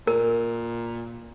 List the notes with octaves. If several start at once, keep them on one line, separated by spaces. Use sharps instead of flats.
A#2 A#4